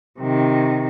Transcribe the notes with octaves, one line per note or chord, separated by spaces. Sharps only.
C3 D#3